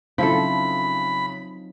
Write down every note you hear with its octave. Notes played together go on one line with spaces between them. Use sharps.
C#3 F3 F#3 C4 D#4 E4 A4 B5